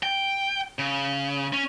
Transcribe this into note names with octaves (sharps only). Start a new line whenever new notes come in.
G5
C#3
C#4